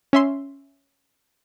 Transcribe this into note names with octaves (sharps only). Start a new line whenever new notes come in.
C#4 E5 C6